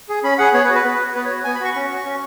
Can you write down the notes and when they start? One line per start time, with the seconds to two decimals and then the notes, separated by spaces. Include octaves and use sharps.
0.09 G#4
0.24 C#4 B5
0.38 G#4 F#5
0.53 B3 C#5
0.64 B4
0.69 F#4
0.75 B4
0.84 B3
1.00 F#4
1.15 B3 B4
1.25 C#5
1.30 F#4
1.44 B3 G#5
1.55 B5
1.60 F#4 C#6
1.76 C#4
1.91 F#4
2.05 C#4